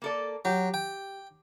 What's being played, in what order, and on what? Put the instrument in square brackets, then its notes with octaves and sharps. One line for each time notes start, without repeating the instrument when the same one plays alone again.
[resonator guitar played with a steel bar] A#3 A4 D5
[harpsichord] F#3 [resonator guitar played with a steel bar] G4
[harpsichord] G5